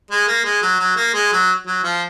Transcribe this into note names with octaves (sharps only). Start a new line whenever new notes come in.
G#3
A#3
G#3
F#3
F#3
A#3
G#3
F#3
F#3
F3